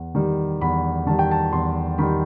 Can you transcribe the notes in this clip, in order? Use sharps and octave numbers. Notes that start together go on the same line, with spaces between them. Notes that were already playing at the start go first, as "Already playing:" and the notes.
Already playing: E2
D#3 G3
E2 B5
D#3 G3 A5
G5
A5
E2 C6
D#3 G3 B5